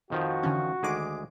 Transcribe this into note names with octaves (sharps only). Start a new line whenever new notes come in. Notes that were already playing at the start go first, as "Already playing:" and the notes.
F2 D#3 F3 F#4
D3 E3 C#4
D2 D#3 G#3 G#4 D6